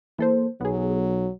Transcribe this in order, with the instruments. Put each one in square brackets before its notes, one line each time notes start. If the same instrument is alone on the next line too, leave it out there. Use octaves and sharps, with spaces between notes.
[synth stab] E3 A4 C5 [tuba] A#3
[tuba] B1 [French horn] F#3 [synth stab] B3 G#4